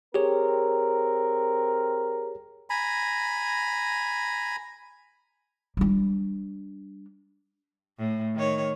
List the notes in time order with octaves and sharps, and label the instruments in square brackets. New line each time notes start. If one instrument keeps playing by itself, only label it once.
[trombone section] C4 A#4 [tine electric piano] G4 G#4 C#5
[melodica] G#5 A#5 B5
[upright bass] G3 D4
[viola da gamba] A2
D#3 C#5